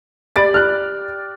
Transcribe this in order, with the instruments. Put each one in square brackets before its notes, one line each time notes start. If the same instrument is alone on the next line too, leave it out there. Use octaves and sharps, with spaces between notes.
[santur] G4 D5 [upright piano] B5 A6 D7
[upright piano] F6 F#6